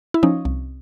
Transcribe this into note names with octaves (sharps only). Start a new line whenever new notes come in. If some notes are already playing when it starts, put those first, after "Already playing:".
E4
F3 C#4 D#4
C2